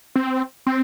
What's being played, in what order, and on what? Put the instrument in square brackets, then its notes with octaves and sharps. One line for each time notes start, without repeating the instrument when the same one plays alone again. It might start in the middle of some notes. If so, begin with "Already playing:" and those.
[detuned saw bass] C4
C4